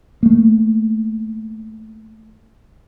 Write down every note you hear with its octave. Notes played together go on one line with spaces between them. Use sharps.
A3 A#3